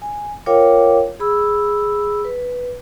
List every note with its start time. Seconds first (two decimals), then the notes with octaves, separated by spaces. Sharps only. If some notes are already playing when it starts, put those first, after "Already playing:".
0.02 G#5
0.46 F4 A#4 C#5 F5 G5 D6
1.20 G#4 B5 E6
2.25 B4